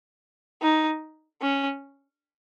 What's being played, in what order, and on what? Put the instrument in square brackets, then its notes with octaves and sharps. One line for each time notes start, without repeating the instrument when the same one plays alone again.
[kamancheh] D#4
C#4